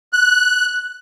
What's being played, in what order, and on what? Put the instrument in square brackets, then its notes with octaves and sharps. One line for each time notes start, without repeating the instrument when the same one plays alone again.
[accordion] F#6